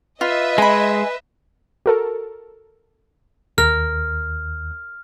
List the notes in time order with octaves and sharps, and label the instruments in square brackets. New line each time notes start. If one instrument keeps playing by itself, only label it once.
[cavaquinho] F4 [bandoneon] B4 [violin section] D#5 E5
[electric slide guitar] G#3 [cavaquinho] G#5 B5
[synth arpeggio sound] F#4 A4 A#4
[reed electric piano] D#2 [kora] A#4 [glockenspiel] F6